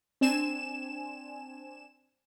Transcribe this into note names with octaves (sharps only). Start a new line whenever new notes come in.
C4 D4 G#5 E7